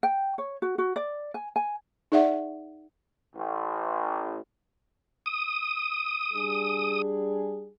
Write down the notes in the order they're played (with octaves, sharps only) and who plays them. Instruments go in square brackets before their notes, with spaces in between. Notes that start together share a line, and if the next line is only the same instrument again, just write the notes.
[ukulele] G5
C#5
F#4
F#4
D5
G#5
G#5
[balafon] D#4 G#4 D5 E5 F#5
[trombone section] A1
[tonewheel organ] D#6
[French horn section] G3 D4 G#4